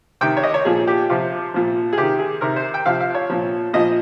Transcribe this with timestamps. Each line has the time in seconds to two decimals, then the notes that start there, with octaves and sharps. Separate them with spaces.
0.21 C3 D#3 G5
0.37 C#5
0.43 D#5
0.54 C#5
0.65 A#2 F3 G#4
0.87 G4
1.09 C3 F3 F4
1.54 A#2 F3
1.93 G#4
1.98 C3 D#3 G4
2.19 G#4
2.41 C3 D#3 A#4
2.56 C5
2.74 G5
2.86 C3 F3 F5
3.00 F5
3.14 C#5
3.30 A#2 F3
3.73 A#2 F3 D#5